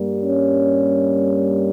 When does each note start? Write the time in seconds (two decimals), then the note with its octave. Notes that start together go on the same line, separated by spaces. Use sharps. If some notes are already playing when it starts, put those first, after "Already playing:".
Already playing: G2 G3 A#3
0.21 C#4